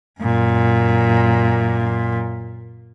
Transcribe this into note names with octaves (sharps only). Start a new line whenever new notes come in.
F#2 A#2